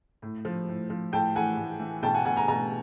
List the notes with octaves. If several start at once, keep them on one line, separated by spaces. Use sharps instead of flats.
A2
F3
A2
F3
A2 G5 A5
E3 F#5 G#5
A2
E3
B2 G5 A5
F#5 G#5
B2 F#5 G#5
G#5 A#5
B2 G#5 A#5